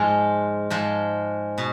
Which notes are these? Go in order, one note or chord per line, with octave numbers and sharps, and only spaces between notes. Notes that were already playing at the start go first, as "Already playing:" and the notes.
Already playing: G#2 F3 G#3 F4
G#2 F3 G#3
B2